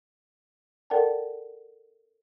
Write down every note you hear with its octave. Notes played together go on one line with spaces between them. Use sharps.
A4 A#4 D5 F#5 G5 A5